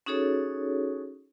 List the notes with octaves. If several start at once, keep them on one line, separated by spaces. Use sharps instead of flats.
C#4 D#4 F#4 G#4 A4 C#5